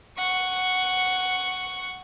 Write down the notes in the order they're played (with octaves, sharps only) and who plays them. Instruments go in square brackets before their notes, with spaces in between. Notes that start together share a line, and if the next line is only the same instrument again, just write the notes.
[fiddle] F#5 C#6